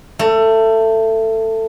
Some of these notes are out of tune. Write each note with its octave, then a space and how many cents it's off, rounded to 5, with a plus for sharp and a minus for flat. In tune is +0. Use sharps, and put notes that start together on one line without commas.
A3 +20